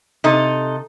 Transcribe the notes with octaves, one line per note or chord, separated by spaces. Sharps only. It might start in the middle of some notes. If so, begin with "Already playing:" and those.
C3 D#4 A4